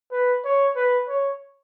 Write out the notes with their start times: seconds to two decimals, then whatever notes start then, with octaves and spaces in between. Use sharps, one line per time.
0.12 B4
0.45 C#5
0.76 B4
1.08 C#5